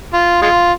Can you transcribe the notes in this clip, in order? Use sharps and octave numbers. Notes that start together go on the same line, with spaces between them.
F4
G#3 F4